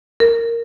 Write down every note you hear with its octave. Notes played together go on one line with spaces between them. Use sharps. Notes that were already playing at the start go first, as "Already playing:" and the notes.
A#4